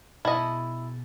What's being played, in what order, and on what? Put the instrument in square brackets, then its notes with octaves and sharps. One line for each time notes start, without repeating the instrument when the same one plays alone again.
[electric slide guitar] B2 G#4 A5 [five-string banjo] E4 D#5